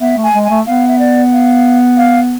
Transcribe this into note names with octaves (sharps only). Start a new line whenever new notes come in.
B3 E5
A3
G#5
G#3
G#5
A3
B3 F5
E5
D5
F5
F5